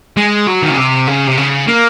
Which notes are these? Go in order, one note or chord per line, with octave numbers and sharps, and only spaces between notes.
G#3
F#3
D#3
C#3
C3
C#3
C3
C#3
A#3